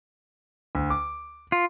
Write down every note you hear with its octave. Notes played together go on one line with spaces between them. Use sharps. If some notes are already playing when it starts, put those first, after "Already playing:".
D2
D6
F4